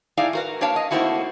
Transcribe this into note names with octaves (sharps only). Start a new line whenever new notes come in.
A2 D#4 E4 G#4 D5 F5
F#4 A#4 B4
A#3 D4 A#4 C#5 F5 A5
D#5
A3 A#3 C4 D#4 E4 F#4